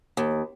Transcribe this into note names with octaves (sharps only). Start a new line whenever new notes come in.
D#2